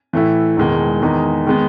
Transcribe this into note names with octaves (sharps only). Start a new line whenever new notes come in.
A2 E3 A3 E4
E1 E2 D#3 G#3
E2 D#3 G#3 D#4
D#3 G#3 B3